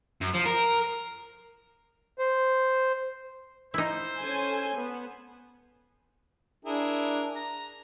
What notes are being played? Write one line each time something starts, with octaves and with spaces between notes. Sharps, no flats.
F#2
F3
A#4
C5
D#4 E4 C5
C#4 A4 G#5
B3
D4 E4 G#4 A#4
A#5